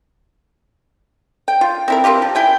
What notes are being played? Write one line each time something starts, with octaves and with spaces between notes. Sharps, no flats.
G5
F4
C4 E4 A#4
C4 E4 F4 G4
F3
E4 G5 G#5